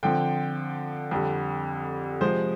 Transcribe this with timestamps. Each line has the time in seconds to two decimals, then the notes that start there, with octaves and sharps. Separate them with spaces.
0.03 D3 F3 C4 G5
1.11 F2 D3 G3
2.21 C3 F3 G#3 C5